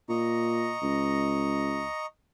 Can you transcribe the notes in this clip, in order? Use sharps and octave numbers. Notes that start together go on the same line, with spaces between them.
A#2 D#5 A#5 C#6
C#2